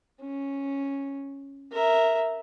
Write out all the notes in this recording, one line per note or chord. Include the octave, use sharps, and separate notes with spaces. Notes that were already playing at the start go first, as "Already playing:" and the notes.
C#4
A#4 E5